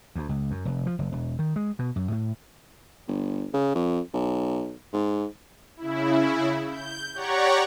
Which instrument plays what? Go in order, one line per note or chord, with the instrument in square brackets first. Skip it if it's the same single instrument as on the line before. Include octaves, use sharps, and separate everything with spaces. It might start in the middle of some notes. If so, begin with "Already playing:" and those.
[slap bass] D2
C#2
F#2
F1
F3
F#1
E1
D#3
G#3
B2
F#2
A2
[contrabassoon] G1
C#3
F2
B1
G#2
[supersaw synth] C#3 E4
G6
G4 C#5 D5 F#5 A#5 C#6